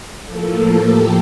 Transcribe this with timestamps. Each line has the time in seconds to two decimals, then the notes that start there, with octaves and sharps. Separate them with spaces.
0.25 A2 F3 A#3 A4
0.83 G4